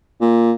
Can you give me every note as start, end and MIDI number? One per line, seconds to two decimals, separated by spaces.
0.21 0.52 46